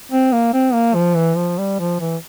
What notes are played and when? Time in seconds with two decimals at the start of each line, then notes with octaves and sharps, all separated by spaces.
0.12 C4
0.32 A#3
0.53 C4
0.73 A#3
0.95 F3
1.16 E3
1.37 F3
1.58 G3
1.79 F3
2.00 E3